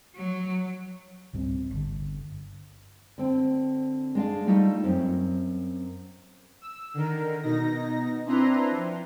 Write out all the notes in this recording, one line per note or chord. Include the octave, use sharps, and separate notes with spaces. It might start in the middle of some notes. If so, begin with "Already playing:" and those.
F#3
C#2 G#2 G3 C4
G1 D3
D3 C4
G#3 D4 F5
G3 A3 D#4 F4 A4
F#2 C4
E6
D3 D#3 A#4
B2 D#4 A#6
C4 D4 E4 B4 A#5 C6
F3